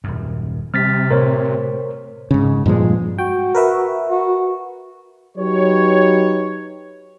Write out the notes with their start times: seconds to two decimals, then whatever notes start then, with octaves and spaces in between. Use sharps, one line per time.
0.04 D#1 F#2
0.74 C3 G3 F6 A6 B6
1.11 A2 A#4 C5 C#5
2.31 G#2 C#3
2.66 G2 A#2 F3 G#3
3.18 F#4 G5
3.55 A#4 B4 E5
4.09 F#4
5.37 F#3 D#4 G4 B4 C#5